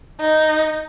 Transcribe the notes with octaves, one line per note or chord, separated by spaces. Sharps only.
D#4